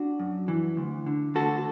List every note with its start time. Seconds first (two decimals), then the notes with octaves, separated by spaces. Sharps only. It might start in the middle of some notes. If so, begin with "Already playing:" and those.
Already playing: D4 F#4
0.20 F#2
0.48 E3
0.77 D2
1.06 D3
1.35 D2 F#4 A4